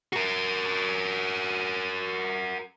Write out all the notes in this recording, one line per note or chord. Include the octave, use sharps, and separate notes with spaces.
F#4 A#4